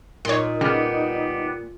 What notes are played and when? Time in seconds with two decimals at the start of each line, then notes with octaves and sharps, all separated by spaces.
0.25 A#2 D#4 C#5 C6
0.61 C#3 G3 B3 F6